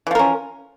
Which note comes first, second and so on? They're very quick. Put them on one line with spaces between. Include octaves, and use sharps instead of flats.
E3 F3 A#4 C#4